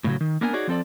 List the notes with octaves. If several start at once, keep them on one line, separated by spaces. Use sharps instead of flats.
A2 C#3 F#3
D#3
A#3 B3 D4 A#4 E5 G#5
D#4 F#4 G#4 C#5 D5
F3 C4 A4 D5